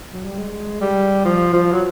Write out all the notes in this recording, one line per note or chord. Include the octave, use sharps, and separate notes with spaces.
F#3
G3
G#3
G3
F3
F3
F#3